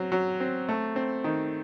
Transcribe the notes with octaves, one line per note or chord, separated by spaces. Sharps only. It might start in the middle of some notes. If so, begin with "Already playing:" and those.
Already playing: F#3 C4
F#3
C4
A3
C4
D#3